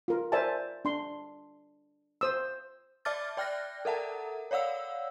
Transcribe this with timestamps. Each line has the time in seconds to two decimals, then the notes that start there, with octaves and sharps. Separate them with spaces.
0.08 F4 A#4
0.32 A#4 C5 D5 E5 G#5 A5
0.85 D4 C6
2.21 C5 D#6 E6
3.05 D5 E5 A5 D6 F6 A6
3.37 D5 G5 F6 F#6 A#6
3.85 A4 A#4 E5 F#5 A5 A#5
4.51 C#5 D5 F5 F#5 E6